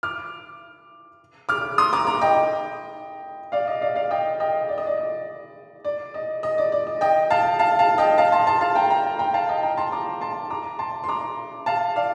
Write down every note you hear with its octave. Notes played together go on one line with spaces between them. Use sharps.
D6 F6
D6 F6
C6 D#6
A#5 D6
A#5 D6
D#5 G5
D5 F5
D#5
D5 F5
D5 F5
D#5 G5
D#5 G5
D5
D#5
D5
D#5
D5
D#5
D#5
D5
D5
D#5
D#5 G5
F5 A5
F5 A5
F5 A5
D#5 G5
F5 A5
A5 C6
A5 C6
F5 A5
G5 A#5
G5 A#5
G5 A#5
F5 A5
D#5 G5
G5 A#5
A5 C6
A#5 D6
A5 C6
A#5 D6
A5 C6
C6
A#5 D6
F5 A5
D5 F5